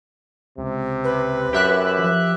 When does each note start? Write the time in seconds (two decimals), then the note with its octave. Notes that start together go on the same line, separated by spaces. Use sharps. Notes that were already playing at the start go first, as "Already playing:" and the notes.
0.58 C#2 C3
1.04 B4
1.53 F#2 G4 E5 F#6
1.99 F3